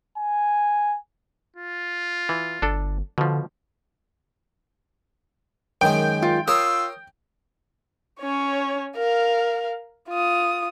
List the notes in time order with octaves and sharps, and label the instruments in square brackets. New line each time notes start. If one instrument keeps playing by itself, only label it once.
[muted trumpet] G#5
F4
[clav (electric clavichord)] E3
[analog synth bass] G1 [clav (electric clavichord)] D4 A4
[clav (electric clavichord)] B2 F3 [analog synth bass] D3
[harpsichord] F#2 D#3 G#3 [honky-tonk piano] G5
[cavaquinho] F4
[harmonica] F4 E6 [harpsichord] A#4 C#5 [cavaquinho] D#6
[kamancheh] C#4 C#5
A#4 F5
F4 D#6